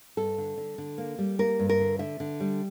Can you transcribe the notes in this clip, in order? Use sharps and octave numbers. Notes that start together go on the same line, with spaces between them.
G2 A4
D3
D3
D3
A#3
G3
A#3 A#4
G2
A#4
D3
D3 E5
D3
G3